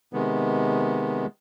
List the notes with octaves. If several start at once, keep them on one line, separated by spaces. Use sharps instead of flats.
C3 D#3 G#3 B3